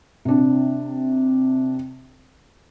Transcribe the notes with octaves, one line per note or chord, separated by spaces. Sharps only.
C3 D4